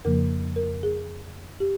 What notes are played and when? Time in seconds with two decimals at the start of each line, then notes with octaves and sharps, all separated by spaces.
0.05 F2 C#3 F3 A#3 A#4
0.56 A#4
0.83 G#4
1.60 G4